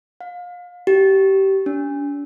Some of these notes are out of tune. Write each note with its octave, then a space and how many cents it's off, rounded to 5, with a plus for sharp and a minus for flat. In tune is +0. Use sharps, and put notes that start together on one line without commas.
F5 +30
G4 -25
D4 -40